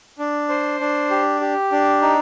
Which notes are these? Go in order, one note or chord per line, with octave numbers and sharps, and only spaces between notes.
D4
C5
D4
G4
G4
D4
D#4